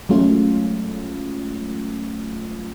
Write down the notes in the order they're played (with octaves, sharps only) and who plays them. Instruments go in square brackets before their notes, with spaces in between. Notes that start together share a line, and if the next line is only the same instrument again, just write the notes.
[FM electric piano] F#3 G#3 A3 C#4 F4